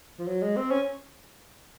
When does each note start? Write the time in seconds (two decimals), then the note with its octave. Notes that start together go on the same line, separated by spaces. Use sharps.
0.19 F3
0.28 F#3
0.42 G#3
0.57 C4
0.71 C#4